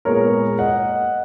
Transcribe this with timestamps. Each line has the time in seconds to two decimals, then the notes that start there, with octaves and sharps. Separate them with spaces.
0.05 A#2 G#3 B3 A#4 C#5
0.59 D#5 F#5